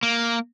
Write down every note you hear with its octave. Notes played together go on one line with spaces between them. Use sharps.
A#3